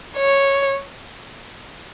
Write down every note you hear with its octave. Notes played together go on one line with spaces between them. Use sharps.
C#5